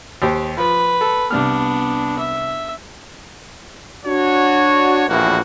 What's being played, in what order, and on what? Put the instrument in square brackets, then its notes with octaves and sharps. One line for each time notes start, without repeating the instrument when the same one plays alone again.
[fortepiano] D#2 G4 C5
[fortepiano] F3 [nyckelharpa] B4
[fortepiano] A4
[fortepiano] C2 G3 F6 [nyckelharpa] B3 D4
[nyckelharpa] E5
[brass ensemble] D4 F#4 C#5
A#1 E2 A2 E3 A#3 F#4